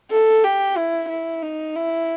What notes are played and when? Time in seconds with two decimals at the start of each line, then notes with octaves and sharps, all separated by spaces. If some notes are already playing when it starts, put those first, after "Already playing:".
0.11 A4
0.44 G4
0.77 E4
1.09 E4
1.42 D#4
1.75 E4